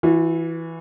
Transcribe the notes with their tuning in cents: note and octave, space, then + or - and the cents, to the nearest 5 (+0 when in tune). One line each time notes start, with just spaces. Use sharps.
E3 +0 F#4 -40